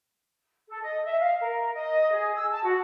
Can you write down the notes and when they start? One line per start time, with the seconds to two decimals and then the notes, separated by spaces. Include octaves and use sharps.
0.68 A4
0.82 D#5
1.04 E5
1.19 F5
1.40 A#4
1.73 D#5
2.13 G#4
2.35 E6
2.51 A5
2.62 F#4